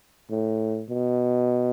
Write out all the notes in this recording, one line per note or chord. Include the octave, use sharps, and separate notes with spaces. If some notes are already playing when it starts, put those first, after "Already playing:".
A2
B2